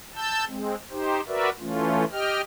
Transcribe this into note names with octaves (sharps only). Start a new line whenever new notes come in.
A5 E6 G6
G#3 C4
D#4 G4 C5
F#4 A#4 B4 D5 E5
E3 A3 C#4 F4
G4 D#5 G5 F6